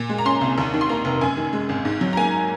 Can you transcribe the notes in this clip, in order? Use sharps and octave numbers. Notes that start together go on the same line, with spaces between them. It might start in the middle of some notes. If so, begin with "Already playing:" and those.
Already playing: A#2
G#3
A#5
C#4 C6
C2
D#2
D#3
C6
A#3 A#5
F1
F#2 G#5
D#3
G#3
G#1
G#2
F#3
A#5
A#3 G#5